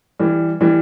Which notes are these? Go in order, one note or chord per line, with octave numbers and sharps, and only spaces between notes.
E3 G3
E3 G3